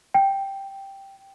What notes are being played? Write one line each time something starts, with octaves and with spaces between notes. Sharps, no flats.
G5